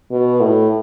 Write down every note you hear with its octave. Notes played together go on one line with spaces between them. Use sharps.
B2
A2